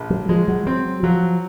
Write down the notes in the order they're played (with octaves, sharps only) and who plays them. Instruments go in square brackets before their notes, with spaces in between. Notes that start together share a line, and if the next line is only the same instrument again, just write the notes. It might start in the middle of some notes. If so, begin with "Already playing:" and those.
Already playing: [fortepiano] A#1
[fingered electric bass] F#3
[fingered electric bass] F3 [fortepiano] G#3
[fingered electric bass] F#3
[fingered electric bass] F#3 [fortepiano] C4
[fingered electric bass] F3 [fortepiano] F#3